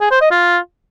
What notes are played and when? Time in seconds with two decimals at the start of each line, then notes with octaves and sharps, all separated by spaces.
0.01 G#4
0.11 C5
0.21 D#5
0.31 F4